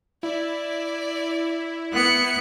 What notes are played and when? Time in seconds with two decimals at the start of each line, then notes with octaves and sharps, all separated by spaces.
0.23 E4 D5
1.93 B3 F#6 C#7